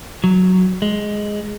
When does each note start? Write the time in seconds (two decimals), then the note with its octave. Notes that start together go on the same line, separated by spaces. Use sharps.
0.24 F#3
0.82 G#3